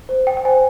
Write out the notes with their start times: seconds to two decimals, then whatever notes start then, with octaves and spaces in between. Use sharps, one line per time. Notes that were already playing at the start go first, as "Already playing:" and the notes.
0.09 C5
0.27 G5
0.37 G5
0.45 C5 G#5